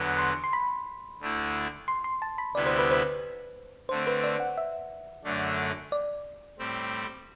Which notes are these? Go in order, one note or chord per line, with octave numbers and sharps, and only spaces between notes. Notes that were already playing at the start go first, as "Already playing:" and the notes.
Already playing: E2 D3 F#3 B3
C6
C6
B5
D2 D3 A3 E4
C6
C6
A5
B5
D2 C3 G3 B3 E4 D5
C5
B4
C5
D3 A3 C4 C5
B4
D5
F#5
E5
F#2 D3 A3 D4
D5
A2 G3 C4